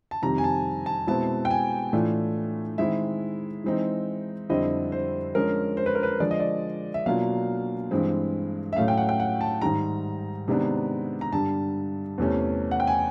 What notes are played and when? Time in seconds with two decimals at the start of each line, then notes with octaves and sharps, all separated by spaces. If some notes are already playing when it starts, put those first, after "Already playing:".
0.11 A5
0.22 F2 C3 D#3 G3 A#5
0.38 G#5
0.44 A5
0.86 A5
1.07 B2 G#3 C4 E4 A5
1.45 G5
1.51 G#5
1.93 A2 E3 A3 D4 F4
2.78 D#3 G#3 C4 E4 E5
3.64 E3 G#3 C4 D#4
4.49 F2 D3 G3 C4 E4 D#5
4.92 C5
5.35 D3 F3 G#3 C#4 A#4
5.77 C5
5.86 B4
5.95 A#4
6.03 B4
6.20 D3 F3 G#3 D5
6.31 D#5
6.40 D5
6.94 E5
7.06 B2 F#3 A#3 D4 F4 F5
7.91 G2 E3 G#3 C4
8.73 E5
8.76 A2 F#3 A3 C#4 F5
8.88 G5
8.97 F#5
9.09 G5
9.20 F#5
9.41 A5
9.62 G#2 D#3 G3 A#5
10.48 C3 D#3 G#3 B3 D4
11.21 A#5
11.33 G2 D3 G3 A5
12.18 E2 C3 E3 A3 C#4
12.71 F#5
12.80 G5
12.87 G#5